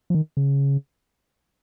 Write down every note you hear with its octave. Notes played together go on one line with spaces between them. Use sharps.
F3
D#3
C#3